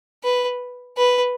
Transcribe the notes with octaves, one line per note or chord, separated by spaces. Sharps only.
B4
B4